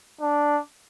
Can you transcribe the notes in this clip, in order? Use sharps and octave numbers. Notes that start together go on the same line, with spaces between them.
D4